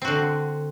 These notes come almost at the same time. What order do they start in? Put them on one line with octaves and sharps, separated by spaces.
C4 F#4 D3